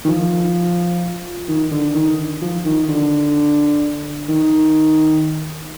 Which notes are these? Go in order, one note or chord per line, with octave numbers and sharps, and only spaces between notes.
D#3
F3
D#3
D3
D#3
F3
D#3
D3
D#3